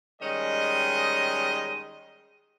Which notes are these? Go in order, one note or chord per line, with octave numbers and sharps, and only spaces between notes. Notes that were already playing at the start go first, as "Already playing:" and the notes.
D#3 G3 G#3 C#4 D#5